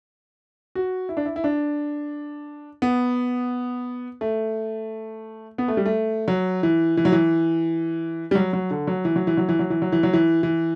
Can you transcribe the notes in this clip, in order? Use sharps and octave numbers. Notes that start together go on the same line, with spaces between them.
F#4
E4
D4
E4
E4
D4
B3
A3
B3
A3
G3
A3
F#3
E3
E3
F#3
E3
G3
F#3
F#3
D3
F#3
E3
F#3
E3
F#3
E3
F#3
E3
F#3
E3
F#3
E3
E3